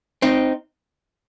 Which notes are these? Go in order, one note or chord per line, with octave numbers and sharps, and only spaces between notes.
C4 D#4